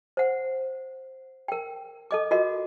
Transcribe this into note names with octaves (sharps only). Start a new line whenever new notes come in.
C5 F#5
A#4 G5
A4 D#5 D6
F4 F#4 A#4 D#5